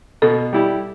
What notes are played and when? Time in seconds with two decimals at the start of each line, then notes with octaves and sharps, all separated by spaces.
0.22 B2 A4
0.53 G3 E4 G4